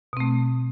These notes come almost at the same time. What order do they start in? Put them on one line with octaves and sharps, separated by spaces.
B2 C4 A3